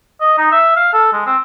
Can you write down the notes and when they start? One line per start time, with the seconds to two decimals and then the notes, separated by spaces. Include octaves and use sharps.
0.21 D#5
0.38 D#4
0.52 E5
0.76 F5
0.93 A4
1.12 G#3
1.26 C4